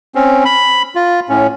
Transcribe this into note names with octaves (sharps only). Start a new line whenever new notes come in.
C4 C#4
B5
F4
A2 C#4